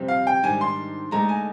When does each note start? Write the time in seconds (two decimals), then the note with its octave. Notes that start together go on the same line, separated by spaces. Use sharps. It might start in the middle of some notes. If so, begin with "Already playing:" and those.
Already playing: F2 C3 G3 C4
0.08 F5
0.27 G5
0.43 G#2 D#3 G3 D4 G#5
0.61 C6
1.11 D2 D3 G#3 D#4 A#5
1.29 G#5